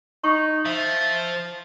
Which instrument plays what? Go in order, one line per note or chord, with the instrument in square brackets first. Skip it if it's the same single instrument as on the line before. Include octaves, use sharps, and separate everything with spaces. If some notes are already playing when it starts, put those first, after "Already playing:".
[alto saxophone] D#4 [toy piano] C#6
[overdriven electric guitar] F3 [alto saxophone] E5